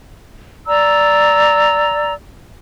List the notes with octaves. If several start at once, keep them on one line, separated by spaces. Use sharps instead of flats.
D5 A#5 E6